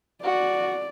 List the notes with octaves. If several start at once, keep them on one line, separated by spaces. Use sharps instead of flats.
F#4 D5